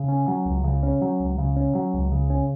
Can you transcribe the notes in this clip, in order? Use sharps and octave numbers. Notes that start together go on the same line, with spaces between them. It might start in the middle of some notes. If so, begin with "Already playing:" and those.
Already playing: C#3
C#4
F#3
C#2
C#3
C#4
F#3
C#2
C#3
C#4
F#3
C#2
C#3
C#4